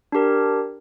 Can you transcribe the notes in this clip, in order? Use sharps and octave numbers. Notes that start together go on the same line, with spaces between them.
D4 G4 A#4